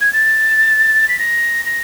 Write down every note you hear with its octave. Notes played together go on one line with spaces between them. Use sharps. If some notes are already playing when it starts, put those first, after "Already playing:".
G#6
A6
B6
A#6
A#6